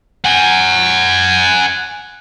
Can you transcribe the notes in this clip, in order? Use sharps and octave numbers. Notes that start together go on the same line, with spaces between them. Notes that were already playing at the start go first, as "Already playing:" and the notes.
F#5 G#5